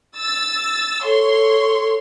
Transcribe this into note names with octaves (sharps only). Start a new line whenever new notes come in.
E6 A6
A4 C#5 C6